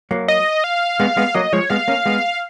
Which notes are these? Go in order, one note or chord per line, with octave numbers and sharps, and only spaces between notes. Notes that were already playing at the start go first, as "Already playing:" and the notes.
F#3 A#3
D#5
F5
G#3 B3
G#3 B3
F#3 A#3 D#5
F3 G#3 C#5
G#3 B3 F5
A#3 C#4
G#3 B3